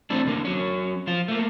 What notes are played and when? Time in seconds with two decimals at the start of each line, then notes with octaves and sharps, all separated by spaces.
0.10 E3 A3 C4 D4
0.25 E2 D3 A#3
0.45 F#3 C#4
1.07 F3 F4
1.28 A3 A#3